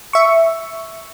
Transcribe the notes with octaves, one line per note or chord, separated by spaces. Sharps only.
E5 C#6